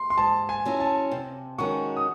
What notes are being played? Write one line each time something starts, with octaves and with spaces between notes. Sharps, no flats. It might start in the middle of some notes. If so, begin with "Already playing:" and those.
Already playing: C6
C6
G#2 A5
G#5
F#3 C#4 E4
A5
C3
D#3 G#3 C#4 F#4 C#6
D#6